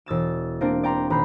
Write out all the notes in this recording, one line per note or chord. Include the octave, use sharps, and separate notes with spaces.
E1 E6 A6 E7
A#3 C4 D4
D5 G5 A#5 C6
D#1 A#5 B5 F#6 G6 C7